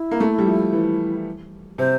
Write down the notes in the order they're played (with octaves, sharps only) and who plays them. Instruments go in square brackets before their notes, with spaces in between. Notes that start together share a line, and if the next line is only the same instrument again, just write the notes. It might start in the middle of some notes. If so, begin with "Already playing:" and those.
Already playing: [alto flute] E4
[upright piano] A#3
A3
G3
F3
E3
[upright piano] C3 [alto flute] C5